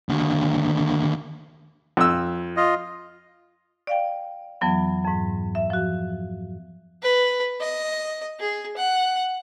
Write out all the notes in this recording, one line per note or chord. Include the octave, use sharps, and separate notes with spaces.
D#2 D3
F2 E6
F4 D#5
D5 F5 G5
F2 E3 F#3 B3
F2 G#2
E5
F3 F#4
B4
D#5
G#4
F#5